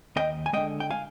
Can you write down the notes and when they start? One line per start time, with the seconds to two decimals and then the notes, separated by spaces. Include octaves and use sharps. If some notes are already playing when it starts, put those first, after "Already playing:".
0.16 D#2 D#5 G5
0.46 G#5
0.53 D3 G#3 D#5 G5
0.80 G5
0.91 F5 G#5